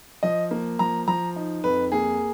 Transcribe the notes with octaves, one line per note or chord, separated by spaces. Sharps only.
F3 D#5
A#3
F3 A#5
F3 A#5
D#4
F2 B4
A#3 G#4